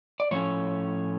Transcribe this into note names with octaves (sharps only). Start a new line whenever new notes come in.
D5
A2 F3 A3 C#4 C#5